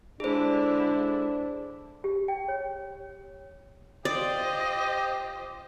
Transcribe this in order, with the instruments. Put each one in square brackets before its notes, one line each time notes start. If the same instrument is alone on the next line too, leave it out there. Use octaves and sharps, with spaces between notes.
[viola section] D3 G#3 E4 [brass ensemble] D4 [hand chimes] G#4 C5
[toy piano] G4
G5
C#5
[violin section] F4 C5 [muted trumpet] G4 [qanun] D5 [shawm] D#5